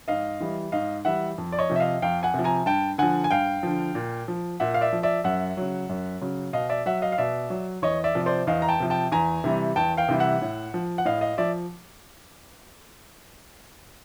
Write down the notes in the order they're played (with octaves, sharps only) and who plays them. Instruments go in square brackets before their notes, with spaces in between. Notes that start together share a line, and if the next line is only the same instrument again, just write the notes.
[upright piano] G#2 D#5 F5
E3 G3
G#2 D#5 F5
E3 G3 E5 F#5
F2
D5
C#5 D#5
C3 F3
E5
D#5 F5
F2 F5 G5
F#5 G#5
C3 F3
G#5 A#5
G2 G5 A5
D3 F3 F#5 G#5
G#5
G2 F5 G5
D3 F3
A#2
F3
A#2 E5 F#5
F5
D5 E5
F3
D5 E5
F#2 E5 F#5
C#3 F#3
F#2
C#3 F#3
B2 D#5 F5
D5 E5
F#3 E5 F#5
D#5 F5
F5
B2 D5 E5
F#3
E2 C#5 D#5
D5 E5
C3 F3
C5 D5
E2 D#5 F5
A#5
G5 A5
C3 F3
G5 A5
E2 G#5 A#5
C3 E3 G3
E2 G5 A5
F5 G5
C3 E3 G3
E5 F#5
A2
F3
F#5
A2 D#5 F5
D#5 F5
F3 D5 E5